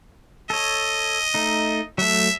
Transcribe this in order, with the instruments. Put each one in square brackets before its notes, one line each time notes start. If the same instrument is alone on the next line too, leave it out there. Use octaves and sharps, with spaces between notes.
[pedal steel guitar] A4 C#5 [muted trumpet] D#5
[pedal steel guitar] A3 D#4
[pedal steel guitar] F#3 A3 [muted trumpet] E5